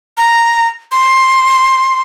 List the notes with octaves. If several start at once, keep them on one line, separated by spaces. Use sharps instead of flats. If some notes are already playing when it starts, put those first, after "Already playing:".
A#5
C6